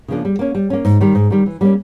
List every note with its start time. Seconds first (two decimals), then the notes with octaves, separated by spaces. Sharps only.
0.08 C#3 F3 A#3 D4
0.25 G3
0.39 A#3 C#4
0.55 G3
0.70 A#3 C#4
0.85 G#2
1.01 D#3 G3
1.15 G#2
1.30 D#3 G3
1.46 E3
1.61 G3 A#3 C#4